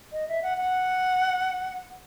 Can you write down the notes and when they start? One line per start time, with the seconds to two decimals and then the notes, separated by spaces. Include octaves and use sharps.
0.13 D#5
0.28 E5
0.43 F#5
0.57 F#5